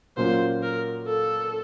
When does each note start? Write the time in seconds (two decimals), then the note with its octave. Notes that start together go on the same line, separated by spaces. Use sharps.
0.17 A#2 F#3 A#3 C#4 F4 C5
0.62 A#4
1.07 A4